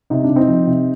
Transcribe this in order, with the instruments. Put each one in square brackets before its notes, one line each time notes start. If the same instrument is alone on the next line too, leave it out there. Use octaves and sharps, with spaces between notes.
[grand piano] C3 D#4
D4
C3
C4 D#4
F3
C3